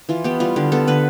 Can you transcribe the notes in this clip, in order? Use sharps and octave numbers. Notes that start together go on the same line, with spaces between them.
E3 F4
B3 G4
G3 F4
D3 G4
B3 A4
D3 B4